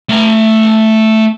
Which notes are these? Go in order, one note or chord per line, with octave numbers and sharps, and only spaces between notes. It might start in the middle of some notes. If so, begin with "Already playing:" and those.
A3 A#5